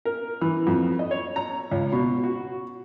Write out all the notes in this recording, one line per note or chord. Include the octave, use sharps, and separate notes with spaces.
A#4
E3
F2
D#5
C#5
A#5
C#2
B2
F#4